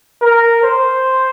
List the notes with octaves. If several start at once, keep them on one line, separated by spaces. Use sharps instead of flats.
A#4
C5